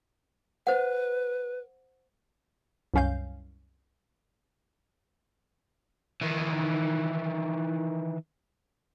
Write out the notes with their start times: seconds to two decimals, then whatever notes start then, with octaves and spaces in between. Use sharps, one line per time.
0.67 B4 C5 F#5
2.94 C2 F#2 C#4 F5 G6
6.21 D#3 E3